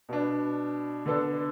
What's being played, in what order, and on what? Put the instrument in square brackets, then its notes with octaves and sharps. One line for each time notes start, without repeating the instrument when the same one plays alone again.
[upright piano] B2 B3 D4
D3 B3 D4 A4